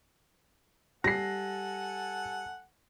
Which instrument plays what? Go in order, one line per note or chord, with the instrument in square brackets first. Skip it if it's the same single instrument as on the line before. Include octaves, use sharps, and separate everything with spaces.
[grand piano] G3 C7 [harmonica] A4 F#5 G#5 [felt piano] A#6